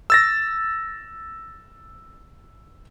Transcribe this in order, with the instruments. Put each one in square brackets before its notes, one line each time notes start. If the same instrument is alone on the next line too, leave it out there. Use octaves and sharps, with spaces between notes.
[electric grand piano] E6 A6 A#6